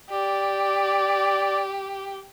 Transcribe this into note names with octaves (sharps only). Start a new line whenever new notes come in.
G4 D5